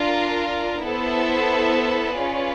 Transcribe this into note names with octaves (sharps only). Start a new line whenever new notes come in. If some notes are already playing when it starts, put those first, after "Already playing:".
Already playing: D4 F4 A#4
B3 E4 A4 C5 E5
C#4 F4 G#4 B4 D5